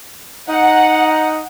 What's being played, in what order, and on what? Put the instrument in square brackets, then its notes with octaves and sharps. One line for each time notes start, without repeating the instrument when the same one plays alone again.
[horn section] D#4 [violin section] F#5